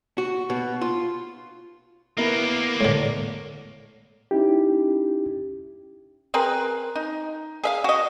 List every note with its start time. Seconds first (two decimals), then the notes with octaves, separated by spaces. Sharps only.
0.18 F#4
0.50 B2
0.81 F4
2.17 A#3 B3 E4 G4 A#4
2.81 A2 D3
4.31 C#4 D#4 E4 G4
6.34 C4 G#4 A#4 B4
6.95 D#4
7.64 G#4 E5 F5
7.84 F#4 D#5